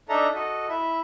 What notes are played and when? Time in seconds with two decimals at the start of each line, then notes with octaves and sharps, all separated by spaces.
0.09 D4 D#4 A4 E5 A#5
0.34 F#4 A4 D#5
0.69 E4 E5